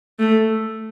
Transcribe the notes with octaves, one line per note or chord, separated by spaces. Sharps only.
A3